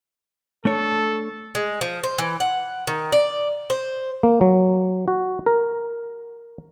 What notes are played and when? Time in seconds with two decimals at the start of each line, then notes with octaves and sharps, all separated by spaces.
0.65 A3 D4 A4 C#5
1.55 G#3
1.81 F3
2.04 C5
2.18 E3
2.40 F#5
2.87 D#3
3.12 D5
3.70 C5
4.23 A#3
4.41 F#3
5.08 F#4
5.46 A#4